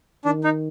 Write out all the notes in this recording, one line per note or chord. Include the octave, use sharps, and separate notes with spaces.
D#3 D4
D#4